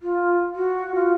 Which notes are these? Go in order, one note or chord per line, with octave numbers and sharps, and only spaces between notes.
F4
F#4
F4